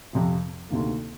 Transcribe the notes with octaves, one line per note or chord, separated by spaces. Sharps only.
F2 C3 F3
D2 C3 D#3 A#3